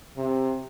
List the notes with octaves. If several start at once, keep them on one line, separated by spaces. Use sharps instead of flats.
C3